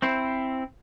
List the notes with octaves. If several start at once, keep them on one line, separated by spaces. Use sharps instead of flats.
C4 E4 C5